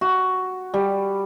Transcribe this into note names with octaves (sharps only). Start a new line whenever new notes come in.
F#4
G3